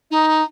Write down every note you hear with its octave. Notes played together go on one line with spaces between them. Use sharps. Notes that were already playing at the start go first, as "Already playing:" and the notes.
D#4